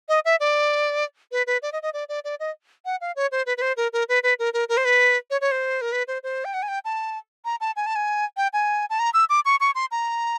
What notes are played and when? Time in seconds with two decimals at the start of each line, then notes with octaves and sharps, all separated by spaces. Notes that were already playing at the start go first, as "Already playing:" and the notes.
0.09 D#5
0.25 E5
0.40 D5
1.32 B4
1.47 B4
1.62 D5
1.72 D#5
1.82 D#5
1.93 D5
2.09 D5
2.24 D5
2.40 D#5
2.85 F#5
3.01 F5
3.16 C#5
3.31 C5
3.46 B4
3.57 B4
3.62 C5
3.77 A#4
3.93 A#4
4.09 B4
4.23 B4
4.39 A#4
4.53 A#4
4.69 A#4
4.77 C5
4.85 B4
5.30 C#5
5.41 C#5
5.51 C5
5.81 A#4
5.92 B4
6.08 C5
6.23 C5
6.45 G5
6.54 F#5
6.62 G#5
6.68 G5
6.85 A5
7.45 A#5
7.61 A5
7.76 G#5
7.86 A5
7.95 G#5
8.37 G5
8.53 G#5
8.90 A5
8.99 A#5
9.14 E6
9.29 D6
9.45 C#6
9.60 C#6
9.75 C6
9.91 A#5